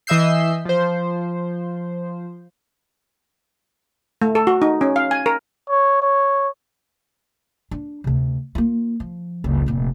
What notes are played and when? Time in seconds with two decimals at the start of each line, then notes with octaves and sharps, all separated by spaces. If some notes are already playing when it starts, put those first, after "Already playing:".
0.07 E3 D#5 E5 E6 G6 C7
0.65 F3 C5
4.21 A3
4.35 A4
4.47 F#4
4.62 D#4
4.81 C#4
4.96 F5
5.11 G#5
5.26 A#4
5.69 C#5
6.02 C#5
7.71 D4
8.04 D2 C3
8.55 A#3 F4
9.00 F3
9.44 F#1 C#2
9.66 F1 A#2